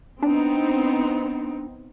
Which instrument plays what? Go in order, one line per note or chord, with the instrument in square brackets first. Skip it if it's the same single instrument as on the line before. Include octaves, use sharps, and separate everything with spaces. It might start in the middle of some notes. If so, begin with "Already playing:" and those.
[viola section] B3 C4 D#4 [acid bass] D4